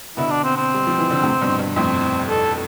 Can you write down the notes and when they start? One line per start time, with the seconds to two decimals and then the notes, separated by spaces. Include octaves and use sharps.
0.17 B2 D3 E4
0.31 D4
0.44 C4
0.57 C4
0.74 G3
0.87 F3
0.99 E3
1.11 D3
1.23 A2 C3
1.41 G2 B2
1.59 G2
1.76 F2 A2 C4
2.29 A4